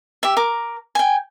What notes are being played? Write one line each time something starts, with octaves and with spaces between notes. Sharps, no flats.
G4 E5
A#4 D6
G5 G#5